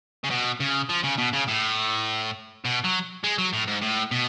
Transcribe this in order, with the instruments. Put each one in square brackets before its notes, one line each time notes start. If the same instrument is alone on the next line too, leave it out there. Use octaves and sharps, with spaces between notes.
[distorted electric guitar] C#3
B2
C#3
F3
C#3
B2
C#3
A2
B2
F#3
G#3
F#3
A2
G#2
A2
B2